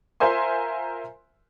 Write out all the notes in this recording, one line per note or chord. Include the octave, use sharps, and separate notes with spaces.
F4 A#4 C5 E5 G#5 C6